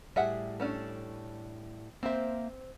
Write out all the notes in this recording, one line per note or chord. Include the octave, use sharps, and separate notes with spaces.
A2 G3 G#4 E5 F#5
A3 C#4 D4
A#3 C4 C5 E5